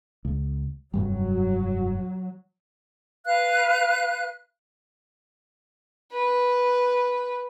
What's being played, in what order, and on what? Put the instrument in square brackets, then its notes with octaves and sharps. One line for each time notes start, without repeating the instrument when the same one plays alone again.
[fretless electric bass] C#2
[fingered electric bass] F1 G2 G3 [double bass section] F#3
[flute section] B4 F5 F#6
[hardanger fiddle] B4